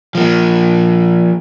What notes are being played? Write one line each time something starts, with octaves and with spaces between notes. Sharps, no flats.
F3 A#3